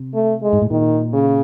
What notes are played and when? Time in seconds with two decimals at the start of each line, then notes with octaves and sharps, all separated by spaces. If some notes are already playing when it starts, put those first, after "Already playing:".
Already playing: C3
0.14 A3
0.43 G#3
0.53 G#2
0.62 A2
0.71 A#2 D#3
1.13 C#3